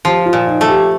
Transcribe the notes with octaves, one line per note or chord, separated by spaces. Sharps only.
F3 G4
F4
A#2
D#4
A3
G4